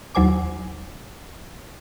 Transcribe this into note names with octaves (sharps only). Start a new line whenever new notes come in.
D#2 F#3 C5 G#5 D6